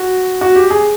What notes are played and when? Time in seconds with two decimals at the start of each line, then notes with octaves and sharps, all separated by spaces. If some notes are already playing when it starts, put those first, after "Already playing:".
Already playing: F#4
0.41 F#4
0.55 G4
0.70 G#4